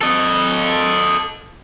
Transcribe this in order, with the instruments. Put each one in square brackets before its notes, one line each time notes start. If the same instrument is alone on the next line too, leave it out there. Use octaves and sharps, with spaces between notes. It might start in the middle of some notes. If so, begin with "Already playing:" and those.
[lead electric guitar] A4 D#5